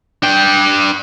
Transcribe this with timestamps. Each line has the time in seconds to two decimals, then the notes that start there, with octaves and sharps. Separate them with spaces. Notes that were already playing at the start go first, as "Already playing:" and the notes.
0.23 D4 G5